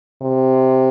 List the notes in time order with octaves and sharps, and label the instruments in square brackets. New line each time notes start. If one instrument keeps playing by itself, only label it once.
[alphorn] C3